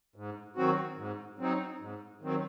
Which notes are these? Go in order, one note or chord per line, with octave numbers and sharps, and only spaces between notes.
G#2
D#3 F#3 C4 F#4
G#2
F#3 C4 D#4
G#2
D#3 F#3 C4